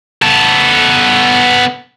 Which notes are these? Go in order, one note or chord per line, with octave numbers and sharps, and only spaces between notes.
B3 A4